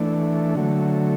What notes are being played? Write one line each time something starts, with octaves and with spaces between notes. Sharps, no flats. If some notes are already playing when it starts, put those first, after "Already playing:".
Already playing: E3 A3 D4
D3 F#3 A3